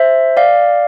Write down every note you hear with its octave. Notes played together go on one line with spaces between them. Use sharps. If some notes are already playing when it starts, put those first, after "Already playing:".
Already playing: C5 E5
D5 F5